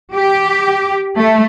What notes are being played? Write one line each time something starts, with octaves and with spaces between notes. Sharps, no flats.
G4
A3